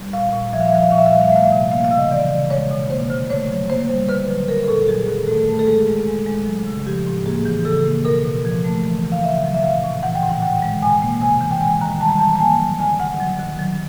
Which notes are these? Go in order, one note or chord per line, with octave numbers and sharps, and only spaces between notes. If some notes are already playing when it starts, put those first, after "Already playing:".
Already playing: G3
A#2 F5
A#2
F3 E5
F5
E5
F3 F5
E5
A#2 F5
E5
F5
G3 E5
F5
E5
A3 F5
E5
C3
A#3 F5
F5
C#3
D#5
E3 D5
C#3
G#3 C#5
B2
A#3 C5
D3
A3 C#5
F#3
A#3 C5
G3
D3 B4
F#3
F#3 A#4
A#4
A#2 A4
F#3 G#4
D#3
A3 A4
A3
A4
G#3 G#4
G#3
G#3
G#3
F#3
C#3
F3 G4
A2
A#3 G#4
E3
C#3 A4
A#3
B2 A#4
B2
F3
A3
E3
E3
F5
C#3 E5
F#3
E5
A#2 F5
A#2
E3 F#5
G5
A2
F#5
D#3 G5
G#3
B2 G#5
A#3
C3 G#5
E3
G5
G#3 G#5
D#3 A#5
G3 A5
A#5
A5
E3
A5
A#3 G#5
F#3
D3 G#5
D3 F#5
F#3
D#3
F#3